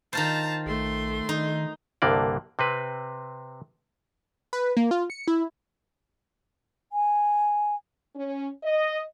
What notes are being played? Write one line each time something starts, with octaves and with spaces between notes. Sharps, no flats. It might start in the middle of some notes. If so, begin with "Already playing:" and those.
D#3 F4 C5 A5 A#5
A#1 A3 C6
D#3 D#4
C2 G2 D3 A#3 D5
C3 C4 B4
B4
A#3
F4
C#7
E4
G#5
C#4
D#5